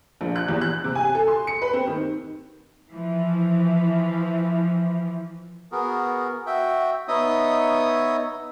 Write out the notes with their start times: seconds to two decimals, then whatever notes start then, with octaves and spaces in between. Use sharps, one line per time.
0.21 A#1
0.36 F#6
0.48 E2
0.61 F#6
0.84 C3
0.95 G#5
1.15 A4
1.28 C6
1.47 C#7
1.62 B4
1.73 C4
1.87 D#3
2.90 E3 F3
5.72 B3 F#4 G#4 A#4
6.46 F#4 E5 G5
7.08 B3 D#4 C#5 D#5 E5 D#6